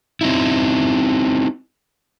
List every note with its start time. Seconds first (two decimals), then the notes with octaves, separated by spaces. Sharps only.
0.21 C4 D#4 E4